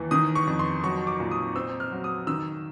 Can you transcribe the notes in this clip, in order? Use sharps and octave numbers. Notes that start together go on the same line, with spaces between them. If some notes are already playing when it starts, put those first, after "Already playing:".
Already playing: D#2 E3
D#3 D#6
C#6
F2
C6
F#3 C#6
D6
A#2
D#6
C4 E6
F6
F#3
D#6
D#3 E6